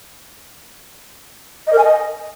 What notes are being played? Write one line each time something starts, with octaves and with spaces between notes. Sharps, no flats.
D#5
A#4
G#5
D#5